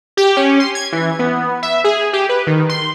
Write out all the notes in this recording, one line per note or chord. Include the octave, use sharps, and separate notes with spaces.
G4
C#4
C6
G#6
E3
B3
E5
G#4
G4
B4
D#3
C6